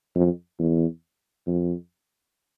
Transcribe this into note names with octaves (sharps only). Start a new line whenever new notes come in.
F2
E2
F2